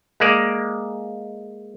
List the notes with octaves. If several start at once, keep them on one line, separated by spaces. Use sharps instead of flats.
G#3 A#3 D5